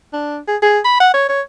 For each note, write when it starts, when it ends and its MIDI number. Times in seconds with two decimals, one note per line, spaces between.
0.13 0.38 62
0.48 0.56 68
0.62 0.79 68
0.84 0.98 83
1.00 1.09 78
1.14 1.27 73
1.29 1.41 73